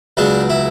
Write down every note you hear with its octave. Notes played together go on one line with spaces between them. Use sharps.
C#2 B2 F#3 D4
E4